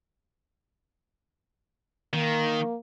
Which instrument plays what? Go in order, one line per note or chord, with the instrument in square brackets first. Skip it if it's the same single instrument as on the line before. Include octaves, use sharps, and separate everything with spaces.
[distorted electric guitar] D#3 [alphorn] A#3